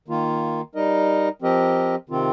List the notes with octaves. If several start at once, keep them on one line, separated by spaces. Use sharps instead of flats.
D#3 A#3 F4
G3 D#4 A#4 D#5
F3 C4 G4 A#4 D#5
C3 D#3 C4 F4